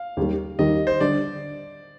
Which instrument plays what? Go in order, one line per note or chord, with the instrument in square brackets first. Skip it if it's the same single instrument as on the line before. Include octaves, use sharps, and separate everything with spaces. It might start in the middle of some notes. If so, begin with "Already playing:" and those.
Already playing: [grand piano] F5
[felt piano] D#2 D#3 G3
[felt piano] D#2 D#3 G3 [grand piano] D#5
[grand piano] C5
[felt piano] D3 G3 D4 [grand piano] D5